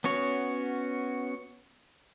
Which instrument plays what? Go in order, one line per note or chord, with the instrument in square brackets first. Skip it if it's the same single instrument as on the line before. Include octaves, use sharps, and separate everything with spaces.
[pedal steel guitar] B3 C#4 F#4 C#5